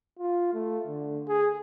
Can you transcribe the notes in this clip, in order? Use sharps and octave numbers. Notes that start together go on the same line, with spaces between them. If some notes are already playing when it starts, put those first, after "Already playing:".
F4
A3
D3
G#4